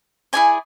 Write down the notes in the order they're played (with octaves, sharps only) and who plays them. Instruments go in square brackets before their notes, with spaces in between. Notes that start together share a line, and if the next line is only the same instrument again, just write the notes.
[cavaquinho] E4 G#4 D5 G#5